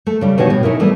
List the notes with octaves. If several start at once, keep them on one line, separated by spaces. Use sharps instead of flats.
A3
C#3 G3
B2 D#3 D4 F#4 G4 C#5
A2
C#4 D#4 E4 A#4
E3 G3 A3 B3